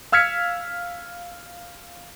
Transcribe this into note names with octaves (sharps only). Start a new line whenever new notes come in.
F5 E6 F6 G#6 B6 C#7